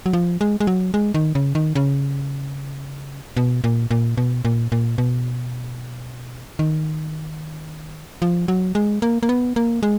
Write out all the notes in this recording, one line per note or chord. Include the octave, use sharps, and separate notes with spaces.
F#3
F3
G#3
G#3
F#3
G#3
D#3
C#3
D#3
C#3
B2
A#2
A#2
B2
A#2
A#2
B2
D#3
F3
F#3
G#3
A#3
A#3
B3
A#3
G#3